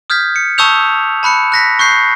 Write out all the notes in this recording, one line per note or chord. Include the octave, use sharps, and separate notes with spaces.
D#6 F6 G6 G#6 B6
C#7
A5 C#6 D#6 E6 G6 F7
A5 B5 F#6 C#7
F#6 A#6 B6
C#6 F#6 G6 C7